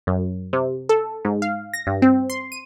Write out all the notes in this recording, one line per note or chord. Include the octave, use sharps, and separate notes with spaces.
F#2
C3
A4
G#2
F5
A#6
G2
C4
C6
D#7